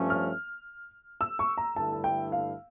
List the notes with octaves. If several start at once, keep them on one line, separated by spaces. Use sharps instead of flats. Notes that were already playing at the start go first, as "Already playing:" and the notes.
Already playing: G2 F3 A3 C#4
F6
E6
C#6
A#5
G2 D3 A3 E4 A4 A5
A5
G5
F5